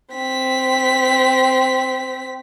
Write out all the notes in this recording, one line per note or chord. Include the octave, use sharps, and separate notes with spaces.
C4 B6